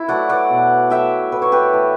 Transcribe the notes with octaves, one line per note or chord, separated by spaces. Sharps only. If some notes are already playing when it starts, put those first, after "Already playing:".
Already playing: E4
F#3 A3 D5 F#5
D5 F#5
B2
F#3 A3 E5 G5
A2 B4
C#5
G4 B4
E3 A3